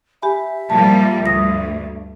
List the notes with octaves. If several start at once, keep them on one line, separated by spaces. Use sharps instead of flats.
G4 E5 G#5 B5
A#2 F3 G3 A5
D2 G2 D#6 A#6